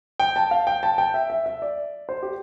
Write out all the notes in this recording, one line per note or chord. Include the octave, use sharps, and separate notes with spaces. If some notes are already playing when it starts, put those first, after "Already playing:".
G5
A5
F5
G5
A5
G5
E5
E5
E5
D5
C5
G4